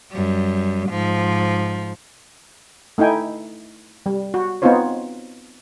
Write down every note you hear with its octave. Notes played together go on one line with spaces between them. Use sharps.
F#2 G3
G#2 F3
A3 D#4 E4 G5 G#5
G3
F#4
B3 C4 D#4 F4 C5 C#5